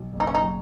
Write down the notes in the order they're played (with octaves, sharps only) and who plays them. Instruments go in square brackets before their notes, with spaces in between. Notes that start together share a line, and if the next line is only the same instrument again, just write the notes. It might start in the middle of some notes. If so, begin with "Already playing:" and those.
Already playing: [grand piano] B1
F#1
[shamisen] D#4
C#4
D#4
[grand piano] F#3